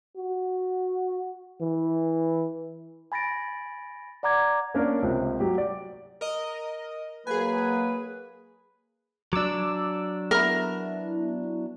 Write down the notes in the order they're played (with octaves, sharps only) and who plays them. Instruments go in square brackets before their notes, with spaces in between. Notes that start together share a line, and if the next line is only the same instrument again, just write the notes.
[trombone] F#4
E3
[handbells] G#5 B5 A6 A#6 D7
D5 F#5 A#5 D6 G#6
[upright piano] A#3 C#4 D4 A#4
C#2 C3
F#3 G4
D5
[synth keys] A#4 D#5
[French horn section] F#3 A#3 [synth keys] G#4 G#5 [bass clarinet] B4
[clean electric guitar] F#3 D4 [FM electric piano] D6 E6
[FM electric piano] B3 E4 [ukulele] A#4